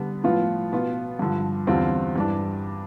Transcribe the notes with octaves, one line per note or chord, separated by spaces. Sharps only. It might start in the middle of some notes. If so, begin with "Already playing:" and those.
Already playing: D3 G3 B3
A2 F3 B3 F4
B2 B3 F4
G2 D3 F3
E2 D3 G3 C4 F4
G2 E3 G3 D4